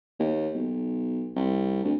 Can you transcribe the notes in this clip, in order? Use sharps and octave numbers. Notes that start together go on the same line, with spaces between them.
D#2
B1
C2
D2